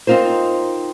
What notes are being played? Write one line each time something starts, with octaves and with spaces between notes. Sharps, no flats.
C4 D#4 F4 A#4 C5